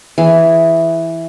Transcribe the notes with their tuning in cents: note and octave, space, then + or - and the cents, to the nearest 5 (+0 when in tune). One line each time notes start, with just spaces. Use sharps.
E3 +0 G#4 +0